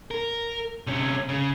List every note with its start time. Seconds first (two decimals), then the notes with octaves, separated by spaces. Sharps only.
0.11 A#4
0.87 C3 C#4
1.29 C#3